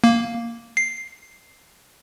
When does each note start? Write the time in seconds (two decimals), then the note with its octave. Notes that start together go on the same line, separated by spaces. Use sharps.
0.04 A#3
0.77 C7